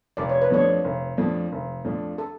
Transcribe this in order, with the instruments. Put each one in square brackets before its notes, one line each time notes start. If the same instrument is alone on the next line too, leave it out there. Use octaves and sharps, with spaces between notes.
[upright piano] F1 [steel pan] D5
[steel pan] C#5
B4
[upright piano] F2 F3 A3 D4 [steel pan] C#5
[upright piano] F1
F2 F3 A3 D4
F1
F2 F3 A3 D4
[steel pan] A4